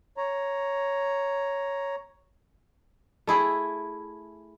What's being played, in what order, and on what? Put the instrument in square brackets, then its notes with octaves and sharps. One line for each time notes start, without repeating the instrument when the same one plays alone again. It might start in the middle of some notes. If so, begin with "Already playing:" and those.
[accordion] C#5 A#5
[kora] A3 E4 G#4